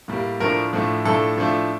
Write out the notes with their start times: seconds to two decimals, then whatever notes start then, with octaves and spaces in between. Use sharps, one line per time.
0.08 A2 G3 A#3
0.40 A2 F3 A3 D4 A#4
0.73 A2 F3 A3 D4
1.05 A2 F3 A3 D4 A4
1.37 A2 F3 A3 D4